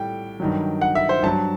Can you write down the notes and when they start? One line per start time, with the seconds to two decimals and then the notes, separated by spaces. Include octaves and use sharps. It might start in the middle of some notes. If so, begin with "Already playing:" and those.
Already playing: A2 G3 G5
0.40 G2 D#3 F#3
0.81 F#5
0.95 E5
1.09 C5
1.23 G2 F#3 A5